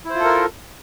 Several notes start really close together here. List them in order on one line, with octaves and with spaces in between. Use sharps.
E4 C5 F4 A4 A#4